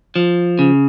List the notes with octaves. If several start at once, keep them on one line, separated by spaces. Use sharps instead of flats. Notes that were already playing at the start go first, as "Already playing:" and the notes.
F3
C#3